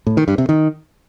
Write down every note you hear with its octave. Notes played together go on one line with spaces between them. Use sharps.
A2
D#3
G2
C3
D#3